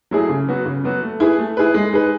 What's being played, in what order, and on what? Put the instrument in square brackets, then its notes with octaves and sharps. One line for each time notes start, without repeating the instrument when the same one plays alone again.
[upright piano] F#3 A3 E4 G#4
C#3
F#3 B3 F#4
C#3
F#3 B3 F#4
A3
E4 G#4 B4
A3
E4 G#4 B4
G#3
D#4 G#4 B4